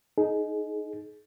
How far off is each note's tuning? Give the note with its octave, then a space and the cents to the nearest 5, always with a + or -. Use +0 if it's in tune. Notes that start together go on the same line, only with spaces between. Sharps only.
D#4 +0 G#4 +30